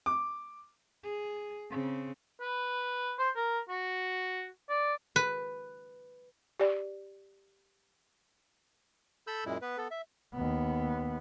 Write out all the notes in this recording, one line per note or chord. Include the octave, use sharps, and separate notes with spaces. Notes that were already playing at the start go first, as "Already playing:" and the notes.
D6
G#4
C#3 C4
B4
C5
A#4
F#4
D5
B4
G4 D5
A4 B5 E6 G6
F#2 A#2 G#3 E4
B3 B4
B3 A4
E5
D#2 B3